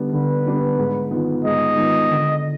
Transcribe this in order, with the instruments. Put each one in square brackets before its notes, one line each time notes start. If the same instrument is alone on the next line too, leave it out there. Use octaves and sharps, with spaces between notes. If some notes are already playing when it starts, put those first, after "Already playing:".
Already playing: [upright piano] D3 G3 B3 D4
[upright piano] D3 [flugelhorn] B4
[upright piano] G3 B3 D4
G#2
D#3 G#3 B3 F4
[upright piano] G#2 [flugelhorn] D#5
[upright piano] D#3 G#3 B3 F4
D3